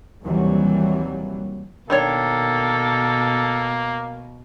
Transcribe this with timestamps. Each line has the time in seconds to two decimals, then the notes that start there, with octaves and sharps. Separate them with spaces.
0.23 D#2 C3 E3 F#3 G3
1.90 B2 D#3 A#3 D4 A4 C#5